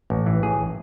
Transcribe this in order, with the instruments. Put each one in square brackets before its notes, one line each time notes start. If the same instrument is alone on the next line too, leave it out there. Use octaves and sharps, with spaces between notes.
[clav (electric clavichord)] A1
E3
A1 G#4